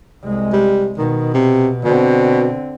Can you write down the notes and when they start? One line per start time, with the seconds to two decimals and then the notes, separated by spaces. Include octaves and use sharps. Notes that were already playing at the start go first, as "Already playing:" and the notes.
0.24 C2 G#3
0.53 G3
0.98 B2 D#3
1.34 C3
1.84 B2 D3 C4